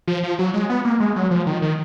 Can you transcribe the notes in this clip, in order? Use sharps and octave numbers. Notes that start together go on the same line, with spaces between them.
F3
F3
F#3
G#3
B3
A#3
G#3
F#3
F3
D#3
D#3